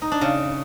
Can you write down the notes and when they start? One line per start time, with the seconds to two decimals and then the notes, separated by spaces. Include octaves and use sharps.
0.02 D#4
0.12 D4
0.21 C#3